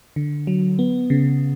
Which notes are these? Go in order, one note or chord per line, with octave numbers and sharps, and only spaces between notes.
D3
F#3
B3
C#3